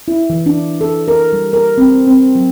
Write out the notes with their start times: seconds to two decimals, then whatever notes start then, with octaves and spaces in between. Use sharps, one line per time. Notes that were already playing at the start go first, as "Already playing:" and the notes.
0.08 E4
0.30 E3
0.46 D4
0.81 A4
1.08 A#4
1.33 G3
1.53 A#4
1.78 C4
2.07 C4
2.35 F#3